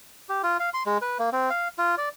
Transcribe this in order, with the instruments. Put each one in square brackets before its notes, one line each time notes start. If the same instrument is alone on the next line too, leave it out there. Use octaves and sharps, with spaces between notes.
[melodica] G4
F4
F5
C6
G#3
B4
A#3
C4
F5
F4
D5